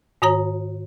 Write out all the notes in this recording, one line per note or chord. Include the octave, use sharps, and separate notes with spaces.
G#2 D#3 F#4 C#5 A#5